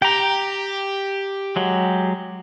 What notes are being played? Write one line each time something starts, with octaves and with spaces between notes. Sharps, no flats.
G4 G5 A#5
F#3 G#3